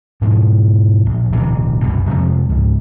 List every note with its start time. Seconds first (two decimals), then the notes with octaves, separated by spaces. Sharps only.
0.21 G#2 B2 F3 G#3
1.06 A#1
1.33 D1 B1 C3 E3
1.81 F#1 C2 F#2 B2
2.08 F2 C3 F3 G#3
2.49 C#2 G#2